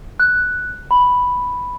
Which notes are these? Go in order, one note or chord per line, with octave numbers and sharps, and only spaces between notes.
F#6
B5